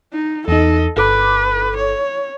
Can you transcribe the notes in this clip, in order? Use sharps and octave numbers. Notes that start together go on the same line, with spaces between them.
D#4
E2 D#4 A4 D#5
G1 A4 B4 D6
C#5